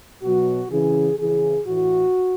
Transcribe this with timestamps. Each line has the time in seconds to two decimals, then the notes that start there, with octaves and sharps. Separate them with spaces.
0.23 B2 F#3 F#4
0.70 C#3 E3 G#4
1.18 C#3 E3 G#4
1.65 A2 E3 F#4